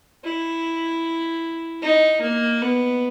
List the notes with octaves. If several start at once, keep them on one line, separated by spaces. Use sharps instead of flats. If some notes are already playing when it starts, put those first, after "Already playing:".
E4
D#4
A#3
B3